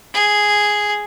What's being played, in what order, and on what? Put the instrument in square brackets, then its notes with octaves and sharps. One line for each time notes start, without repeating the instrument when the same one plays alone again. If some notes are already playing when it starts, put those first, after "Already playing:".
[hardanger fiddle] G#4